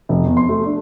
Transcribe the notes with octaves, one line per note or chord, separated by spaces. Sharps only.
F1
E2
C6
A3
D4